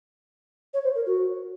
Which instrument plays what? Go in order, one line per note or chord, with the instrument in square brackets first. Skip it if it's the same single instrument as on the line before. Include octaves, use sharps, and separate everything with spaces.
[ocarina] C#5
C5
A#4
F#4